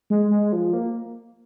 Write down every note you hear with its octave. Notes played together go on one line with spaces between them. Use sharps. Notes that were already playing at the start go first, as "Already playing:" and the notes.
G#3
G#3
F3
A#3